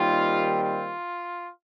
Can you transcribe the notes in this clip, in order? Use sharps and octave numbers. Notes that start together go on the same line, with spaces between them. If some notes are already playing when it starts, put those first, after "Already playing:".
Already playing: D#2 D#3 G3 C4 F4
F4